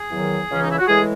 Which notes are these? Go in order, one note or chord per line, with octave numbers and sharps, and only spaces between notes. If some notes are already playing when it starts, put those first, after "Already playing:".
Already playing: G#4
E2 D#3 F#3
C#2 C#3 E3 C#4
D#4
E4
F#4
A2 E3 G#3 G#4